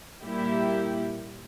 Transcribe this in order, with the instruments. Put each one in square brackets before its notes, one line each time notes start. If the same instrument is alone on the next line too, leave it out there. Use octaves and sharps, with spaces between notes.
[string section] A#2 G3 A#3 E4 G4